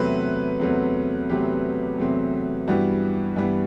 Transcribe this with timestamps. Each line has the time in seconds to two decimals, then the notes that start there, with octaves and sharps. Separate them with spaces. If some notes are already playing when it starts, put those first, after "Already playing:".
Already playing: E2 C3 F#3 A3 C4 B4
0.60 E2 C3 F#3 A3 C4
1.29 E2 C3 F#3 A3 C4 G4
1.98 E2 C3 F#3 A3 C4
2.68 G2 E3 G3 B3 F#4
3.36 G2 E3 G3 B3